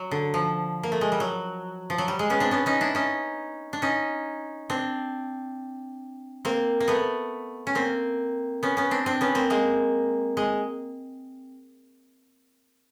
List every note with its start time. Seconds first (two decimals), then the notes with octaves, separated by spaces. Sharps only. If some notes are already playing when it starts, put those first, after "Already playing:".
Already playing: F#3
0.11 D3
0.34 F3
0.83 A#3
0.92 A3
1.01 G#3
1.12 G3
1.20 F#3
1.90 F3
1.98 F#3
2.08 G3
2.19 G#3
2.30 B3 C#4
2.40 C4 D4
2.51 B3 C#4
2.66 C#4 D#4
2.81 D4 E4
2.95 C#4 D#4
3.73 D4
3.82 C#4 D#4
4.70 C4 D4
6.45 A#3 C4
6.80 A#3
6.88 A3 B3
7.67 C#4
7.75 A#3 C4
8.63 B3 C#4
8.77 B3 C#4
8.91 C4 D4
9.06 C4 D4
9.21 B3 C#4
9.35 A#3 C4
9.50 G#3 A#3
10.37 G#3